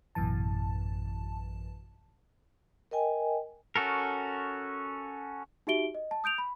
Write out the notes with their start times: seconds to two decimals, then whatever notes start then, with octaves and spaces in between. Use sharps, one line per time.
0.15 A1 F#2 B2 E3 A5
2.91 A#4 D#5 G5 G#5
3.76 C#4 F#4 A4 A#4
5.67 D#4 F#4 G4 E5 D7 G7
5.95 D#5
6.11 A5
6.24 D#6 G6 D7 F7
6.38 B5